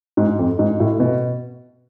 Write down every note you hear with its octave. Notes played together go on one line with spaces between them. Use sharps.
G#2
F2
G#2
A2
B2